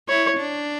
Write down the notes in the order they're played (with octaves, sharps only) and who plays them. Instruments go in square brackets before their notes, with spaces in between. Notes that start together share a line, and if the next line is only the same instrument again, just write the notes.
[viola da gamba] E4 [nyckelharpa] C#5
[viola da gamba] D4